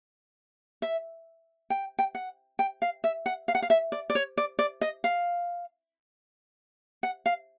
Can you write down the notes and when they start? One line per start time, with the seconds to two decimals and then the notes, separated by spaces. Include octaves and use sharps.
0.82 E5
1.70 G5
1.99 G5
2.15 F#5
2.59 G5
2.82 F5
3.04 E5
3.26 F#5
3.48 F5
3.55 F#5
3.62 F5
3.70 E5
3.92 D5
4.10 D5
4.15 C#5
4.37 D5
4.59 D5
4.81 D#5
5.04 F5
7.03 F#5
7.26 F5